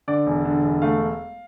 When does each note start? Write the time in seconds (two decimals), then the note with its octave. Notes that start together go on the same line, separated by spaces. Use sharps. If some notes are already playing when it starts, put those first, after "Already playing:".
0.08 D3 D5
0.27 E1
0.45 D3
0.63 E1
0.82 A3 F5